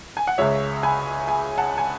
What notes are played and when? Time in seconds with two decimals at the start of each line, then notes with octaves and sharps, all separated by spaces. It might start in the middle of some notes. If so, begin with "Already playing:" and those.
0.17 G#5
0.27 F#5
0.38 C#2 C#3 G#3 C#5 E5
0.83 G#5 B5
1.28 G#5 B5
1.58 F#5 A5
1.78 G#5